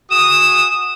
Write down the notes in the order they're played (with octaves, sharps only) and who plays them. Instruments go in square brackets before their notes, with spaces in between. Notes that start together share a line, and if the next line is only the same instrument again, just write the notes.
[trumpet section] F#4 G#4 D#6 [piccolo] E7